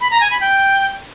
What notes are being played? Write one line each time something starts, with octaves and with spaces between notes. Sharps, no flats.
B5
A#5
G#5
B5
G5